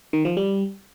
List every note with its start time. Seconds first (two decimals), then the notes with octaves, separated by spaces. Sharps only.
0.13 D#3
0.25 F3
0.37 G3